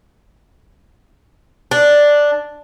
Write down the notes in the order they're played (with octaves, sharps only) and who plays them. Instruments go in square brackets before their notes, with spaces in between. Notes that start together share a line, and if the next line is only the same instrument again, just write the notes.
[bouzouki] D4